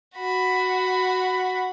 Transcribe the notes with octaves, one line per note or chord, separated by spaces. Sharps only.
F#4 B5